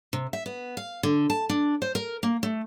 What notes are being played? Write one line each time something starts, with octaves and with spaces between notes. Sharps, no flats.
C3
E5
B3
F5
D3
A5
D4
C5
A#4
A#3
A3